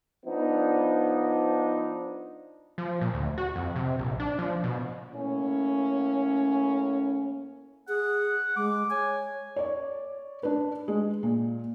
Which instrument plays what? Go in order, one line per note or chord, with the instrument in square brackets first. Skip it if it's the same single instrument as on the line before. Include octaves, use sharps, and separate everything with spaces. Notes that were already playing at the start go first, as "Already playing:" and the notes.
[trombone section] F3 B3 D4 D#4
[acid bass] F3
A#2
D2
F#4
F2
C3
A#1
D4
F3
B2
[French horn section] A2 A#3 C#4
[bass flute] G#4 [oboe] F#5
[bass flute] G#3 [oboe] D6
[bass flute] C#5 [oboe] G#5
[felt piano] C#5 D5
D4 B4
G#3
A#2